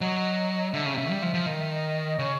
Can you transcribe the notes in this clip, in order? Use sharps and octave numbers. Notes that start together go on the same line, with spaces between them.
F#3 D#5
D#5
D3 E5
C#3
C3
C#3
G3
F3
F3
D#3 D#5
E5
D#5
C#3 C#5